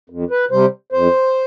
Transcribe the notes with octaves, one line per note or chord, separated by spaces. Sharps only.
F2
B4
C3 G3 C5
F2 C5